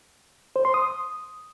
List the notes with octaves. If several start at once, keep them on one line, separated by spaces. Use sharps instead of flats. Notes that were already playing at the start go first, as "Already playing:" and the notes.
C5
C6
D#6